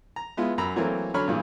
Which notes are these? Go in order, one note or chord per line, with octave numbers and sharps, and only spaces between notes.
A#5
G#3 B3 E4 F4
F#2 A#5 B5 E6
E3 F#3 A3 A#3 C4 A#4
D3 F#3 C#4 C#5 B5 F6
G2 A#2 E3 G#4